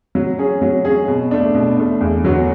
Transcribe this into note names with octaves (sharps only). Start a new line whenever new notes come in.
F#3
C#4 G#4
F#3
C#4 G#4
B2
A3 D4
B2
A3 D4
E2
D3 F#3 B3 F#4